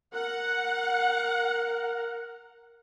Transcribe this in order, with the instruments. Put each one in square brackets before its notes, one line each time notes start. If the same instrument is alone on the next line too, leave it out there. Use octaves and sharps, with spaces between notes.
[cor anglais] A#4 [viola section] F#5